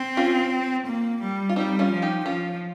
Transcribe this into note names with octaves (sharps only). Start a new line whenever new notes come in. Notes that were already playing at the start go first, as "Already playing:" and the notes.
Already playing: C4
C#4 F4
A#3
G3
F4
G3 C4 D#4
C#4 F4
F3
D#4 G4
F3 C#4 F4